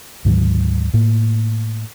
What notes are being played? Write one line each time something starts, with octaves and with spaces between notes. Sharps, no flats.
D2 G#2 D#3 F#3
A2 A#3